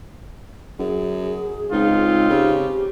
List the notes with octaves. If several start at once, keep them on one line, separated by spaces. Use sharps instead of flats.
F#2 G#4
C#2 C4 D#4 F4
C#3 G4